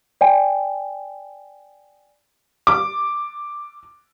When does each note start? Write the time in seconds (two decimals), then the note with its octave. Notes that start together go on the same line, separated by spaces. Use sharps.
0.21 D5 G5 G#5
2.67 D6